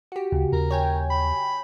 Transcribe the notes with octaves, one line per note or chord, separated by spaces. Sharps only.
F#4 G4
D2 C#3
D#2 A#4
C#5 G5 G#5
B5